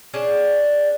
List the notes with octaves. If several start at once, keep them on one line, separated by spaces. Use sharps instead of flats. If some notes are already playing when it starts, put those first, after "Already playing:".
C#4 D4 G#4